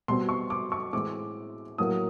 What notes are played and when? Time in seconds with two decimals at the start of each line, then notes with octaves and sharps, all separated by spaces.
0.08 B2 G3 C4 C6
0.29 C#6
0.50 D6
0.72 C#6
0.93 A2 E3 G#3 C4 D6
1.78 A2 F#3 A#3 D#6